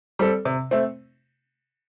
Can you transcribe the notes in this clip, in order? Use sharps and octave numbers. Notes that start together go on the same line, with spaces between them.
G3 C4 A4
C3
A3 C4